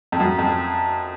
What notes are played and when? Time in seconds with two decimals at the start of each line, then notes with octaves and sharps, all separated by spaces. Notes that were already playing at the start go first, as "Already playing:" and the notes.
0.12 F2
0.20 F#2
0.39 F2